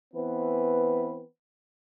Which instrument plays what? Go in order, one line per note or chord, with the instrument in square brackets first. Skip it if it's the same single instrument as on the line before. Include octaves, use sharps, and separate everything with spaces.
[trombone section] E3 B3 C4 B4